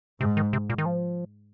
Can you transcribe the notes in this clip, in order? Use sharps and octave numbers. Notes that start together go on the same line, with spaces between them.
G#2 C3
D#3
C3
A#2
D#3
F3